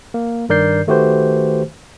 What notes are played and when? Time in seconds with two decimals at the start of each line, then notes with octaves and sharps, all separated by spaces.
0.14 A#3
0.49 G2 D#3 A#4 D5 G6 C7
0.87 D#3 A3 F#4 G4 B4 C5